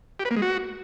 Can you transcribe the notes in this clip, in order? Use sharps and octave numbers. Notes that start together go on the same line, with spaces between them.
G4
B4
A#3
G#3
F#4